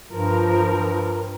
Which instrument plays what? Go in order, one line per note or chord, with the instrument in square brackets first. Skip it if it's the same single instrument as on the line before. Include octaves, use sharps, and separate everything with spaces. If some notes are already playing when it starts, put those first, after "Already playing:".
[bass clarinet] G2 [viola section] F3 A#4